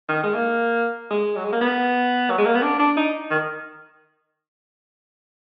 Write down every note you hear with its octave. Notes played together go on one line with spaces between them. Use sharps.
D#3
G#3
A#3
G#3
F#3
G#3
A#3
B3
F#3
G#3
A#3
B3
D4
D4
D#4
D#3